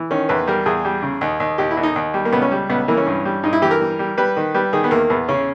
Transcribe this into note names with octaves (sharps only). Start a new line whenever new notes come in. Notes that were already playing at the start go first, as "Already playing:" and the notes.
Already playing: E3
D#3 C#4
E2 B4
G3 A#4
E2 G#4
G3
C#3
D#2
D#2
D#2 G4
E4
D#2
D#4
D#2
G3
A#3
C#2 B3
C#4
G3
C#2 B3
E3 A#3
C#4
G2
G3
G2 D#4
E4
E3 G4
A#4
G3
G3
G3 B4
D#3
G3 B4
D#3 G#4
B3
E2 A#3
E2 B3
C#3 C#4